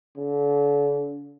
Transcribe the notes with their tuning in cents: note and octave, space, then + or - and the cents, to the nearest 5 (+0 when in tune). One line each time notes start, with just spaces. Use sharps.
D3 -40